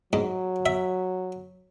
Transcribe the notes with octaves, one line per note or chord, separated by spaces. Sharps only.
G#2 F#3
E5